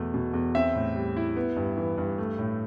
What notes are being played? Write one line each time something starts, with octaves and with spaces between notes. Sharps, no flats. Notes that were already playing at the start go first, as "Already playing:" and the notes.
Already playing: E2 B2 A3
B2
E2
C4 E5
A2
G3
E4
B3
G2
E3
G2
A3
A2